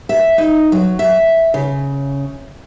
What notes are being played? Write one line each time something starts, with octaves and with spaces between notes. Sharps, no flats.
E5
D#4
F#3
E5
C#3